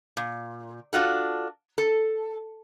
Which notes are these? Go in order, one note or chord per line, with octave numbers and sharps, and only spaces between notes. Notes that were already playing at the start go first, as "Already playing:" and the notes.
A#2
D4 F4 F#4 A4
A4